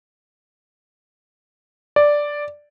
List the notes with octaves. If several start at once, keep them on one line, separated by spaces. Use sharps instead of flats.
D5